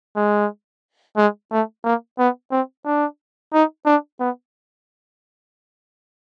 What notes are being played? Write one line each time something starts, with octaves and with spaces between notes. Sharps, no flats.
G#3
G#3
A3
A#3
B3
C4
D4
D#4
D4
B3